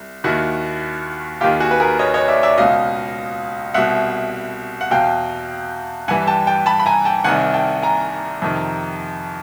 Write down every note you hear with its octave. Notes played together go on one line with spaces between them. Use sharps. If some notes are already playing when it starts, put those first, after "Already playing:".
Already playing: C2
D#2 D#3 E4 F#4
D#2 D#3 F4 G4
F#4 G#4
B4
G#4 A#4
C#5 D#5
C#5 D#5
D5 E5
D5 E5
C#2 B2 D#5 F5
C2 B2 E5 F#5
F#5
E2 B2 F5 G5
G2 E3 F#5 G#5
G5 A5
G5 A5
A5 B5
B5
G#5 A#5
G5 A5
C2 C3 D#3 F#5 G#5
G5 A5
G#5 A#5
F2 C3 D#3